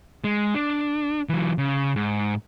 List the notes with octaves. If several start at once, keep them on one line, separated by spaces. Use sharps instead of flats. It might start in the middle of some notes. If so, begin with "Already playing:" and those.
G#3
D4
E3 F#3
C#3
G#2